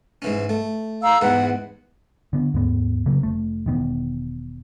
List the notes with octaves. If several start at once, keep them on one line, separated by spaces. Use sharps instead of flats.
G#2 E3 C#4
A3
F5 A#5 E6
E2 G#2 E3 B4 F#5
D3 B3
D#2 G#2 B3
C#3 F#3 A#3
F1 A3
E1 D#3 B3